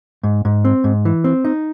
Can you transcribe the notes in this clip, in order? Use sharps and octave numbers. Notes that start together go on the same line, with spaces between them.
G#2
G#2
C4
G#2
E3
C4
D#4